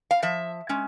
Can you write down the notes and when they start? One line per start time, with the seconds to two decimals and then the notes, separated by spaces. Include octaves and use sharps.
0.11 F5
0.22 F3 E5
0.69 G#3 C#4